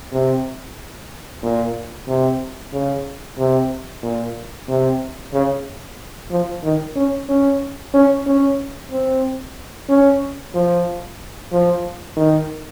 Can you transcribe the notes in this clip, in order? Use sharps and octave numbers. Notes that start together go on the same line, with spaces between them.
C3
A#2
C3
C#3
C3
A#2
C3
C#3
F3
D#3
C#4
C#4
C#4
C#4
C4
C#4
F3
F3
D#3